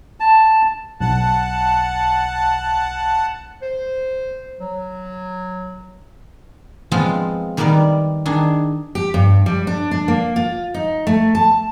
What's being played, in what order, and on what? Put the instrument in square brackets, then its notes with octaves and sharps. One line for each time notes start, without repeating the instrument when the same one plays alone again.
[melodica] A5
[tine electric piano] B1 [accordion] F#5 A5
[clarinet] C5
F#3
[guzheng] F3 G#3 B3 C4 F4
D#3 G3 B3 A#4 D5
D#3 D4 G#4
[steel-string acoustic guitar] G4
G2
G3
D4
D4
A#3
F4
D#4
A3
A5